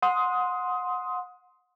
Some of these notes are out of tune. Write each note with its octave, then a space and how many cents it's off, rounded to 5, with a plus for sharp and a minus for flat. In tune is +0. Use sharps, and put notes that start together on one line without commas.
F#5 -25 C6 +0 D#6 +20